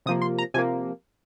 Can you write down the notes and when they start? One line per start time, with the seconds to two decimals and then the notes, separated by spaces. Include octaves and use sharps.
0.06 C3 F3 A#3 D#6
0.22 C6
0.39 A#5
0.54 C3 F3 A#3 G#5